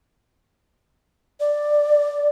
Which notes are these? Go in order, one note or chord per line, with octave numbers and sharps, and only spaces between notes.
D5